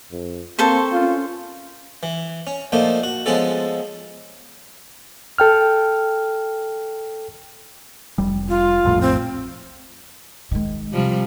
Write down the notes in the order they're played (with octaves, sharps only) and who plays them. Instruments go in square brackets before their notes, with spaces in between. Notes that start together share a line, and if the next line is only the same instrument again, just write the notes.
[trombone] F2
[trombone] A#3 [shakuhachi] C4 [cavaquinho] A4 C5 C#6
[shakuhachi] C#4 [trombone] F4
[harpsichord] E3
C#4
A#2 F3 A3 A#3 D#4
F#4
F3 G#3 B3 C#4 A4
[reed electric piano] A4 G5 F6
[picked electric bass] F1 G3
[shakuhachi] F4
[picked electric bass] A#1 F2 A2
[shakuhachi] C4
[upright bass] D#3 G#3
[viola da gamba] C3 F3 G3